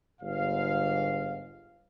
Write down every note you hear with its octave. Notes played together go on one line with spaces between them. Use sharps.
G1 G#2 F5